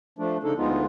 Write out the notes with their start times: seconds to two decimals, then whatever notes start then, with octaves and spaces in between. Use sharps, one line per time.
0.18 F3 A3 D4
0.43 C#3 D4 D#4 A4
0.57 D2 G#3 B3 D#4 F4